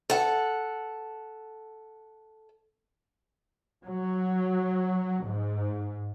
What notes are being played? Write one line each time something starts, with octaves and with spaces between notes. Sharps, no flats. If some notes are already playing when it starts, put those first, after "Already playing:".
A4 F#5
F#3
G#2